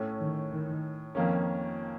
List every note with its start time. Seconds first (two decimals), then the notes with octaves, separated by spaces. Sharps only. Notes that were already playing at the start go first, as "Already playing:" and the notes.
Already playing: A2 A3 C#4
0.20 D#3
0.52 D#3
1.15 F2 D#3 F3 A#3 C#4